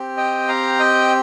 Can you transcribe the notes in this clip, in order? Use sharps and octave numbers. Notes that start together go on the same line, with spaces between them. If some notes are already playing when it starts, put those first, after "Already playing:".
Already playing: C4 G4
D#5 G5
F5 A#5
D#5 G5